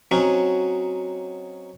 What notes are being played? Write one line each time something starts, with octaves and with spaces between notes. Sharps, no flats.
F#3 C4 C#4 D#4 F#4